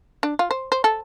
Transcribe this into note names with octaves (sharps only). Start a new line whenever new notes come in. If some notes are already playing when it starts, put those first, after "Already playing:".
D4
F4
C5
C5
A4